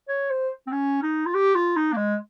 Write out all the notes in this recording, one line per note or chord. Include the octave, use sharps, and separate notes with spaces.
C#5
C5
C4
C#4
D#4
F4
G4
F4
D#4
A#3
G#3